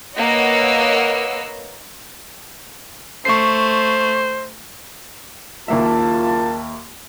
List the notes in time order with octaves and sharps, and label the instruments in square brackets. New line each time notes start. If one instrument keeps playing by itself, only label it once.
[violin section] A#3 B4 C#5 D#5 F#5 E6
[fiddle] A3 [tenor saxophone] C5 [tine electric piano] C#6 C7
[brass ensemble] F#1 A#4 A5 [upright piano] D#2 A#3 E5 [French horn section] F4